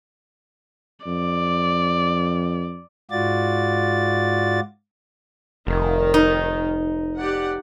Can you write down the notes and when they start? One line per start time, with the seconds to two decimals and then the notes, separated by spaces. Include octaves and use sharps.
1.06 F2 D5
3.11 G#2 F4 F#4 D5 A6
5.67 F1 D#3
6.14 D#4
7.18 G4 D5 F#5